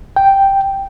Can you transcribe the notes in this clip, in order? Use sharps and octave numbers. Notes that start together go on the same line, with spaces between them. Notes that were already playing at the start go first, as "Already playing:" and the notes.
G5